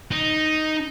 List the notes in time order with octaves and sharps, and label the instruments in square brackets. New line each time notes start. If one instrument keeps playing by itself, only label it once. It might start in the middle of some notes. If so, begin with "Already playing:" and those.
[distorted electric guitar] D#4